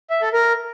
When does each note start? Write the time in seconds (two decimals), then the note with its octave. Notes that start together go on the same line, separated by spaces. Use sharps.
0.10 E5
0.22 A4
0.33 A#4